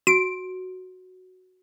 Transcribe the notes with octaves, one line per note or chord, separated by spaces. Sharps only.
F#4 D7